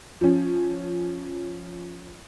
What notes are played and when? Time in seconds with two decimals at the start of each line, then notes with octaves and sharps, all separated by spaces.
0.21 F3 C#4